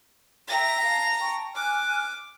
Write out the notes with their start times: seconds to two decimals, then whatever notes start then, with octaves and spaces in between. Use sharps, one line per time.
0.48 E5 G5 A#5 A#6
0.83 F5 A5
1.20 G5 A5 C#6
1.55 G#5 D6 F6 F#6